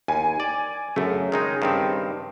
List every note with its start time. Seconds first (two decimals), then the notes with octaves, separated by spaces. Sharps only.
0.08 D#2 G#5
0.40 D5
0.96 F#2 C#3 A3
1.32 D#3 G#3 D#4
1.62 G2 D#3 C4